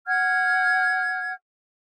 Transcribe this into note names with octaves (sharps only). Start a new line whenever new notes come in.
F#5 F6 G#6